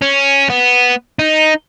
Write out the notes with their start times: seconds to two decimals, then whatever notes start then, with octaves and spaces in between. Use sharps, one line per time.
0.02 C#4
0.50 B3
1.19 D#4